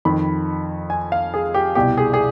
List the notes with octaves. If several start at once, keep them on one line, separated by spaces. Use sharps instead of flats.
F2 D#3 B5
G#5
F5
G#4
G4
C2 B2 G4
G#4
G#4